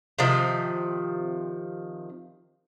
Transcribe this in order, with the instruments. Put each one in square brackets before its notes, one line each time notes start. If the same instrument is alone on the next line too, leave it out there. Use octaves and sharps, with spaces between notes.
[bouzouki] C3 D#3 F3